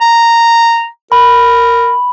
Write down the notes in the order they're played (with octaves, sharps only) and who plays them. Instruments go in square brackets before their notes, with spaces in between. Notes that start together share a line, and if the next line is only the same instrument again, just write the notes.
[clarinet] A#5
[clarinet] A#4 [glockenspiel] B5